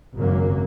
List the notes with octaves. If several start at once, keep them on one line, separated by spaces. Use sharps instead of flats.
G#1 F#2 C#3 F#3 A#3